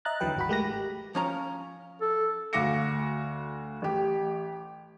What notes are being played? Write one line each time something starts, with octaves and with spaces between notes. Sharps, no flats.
D#5 E5 A#5 F#6 A6
D#2 D3 E3 F#3 B4 G5
G#1 F#4 B5
G#3 A3 G4 A#4 F#6 A#6
G4
F3 C#4 A#5
A4
D2 F#4 F5 D6 A#6 C#7
A1 G4